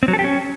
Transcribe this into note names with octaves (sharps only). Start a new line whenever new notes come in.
C4
F#3
A4
G4
C#4